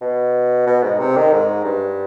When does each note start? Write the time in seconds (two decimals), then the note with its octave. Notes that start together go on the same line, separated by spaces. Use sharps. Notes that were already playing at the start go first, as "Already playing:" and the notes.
0.01 B2
0.67 B2
0.83 G#2
0.99 C3
1.17 D#3
1.33 G#2
1.65 G2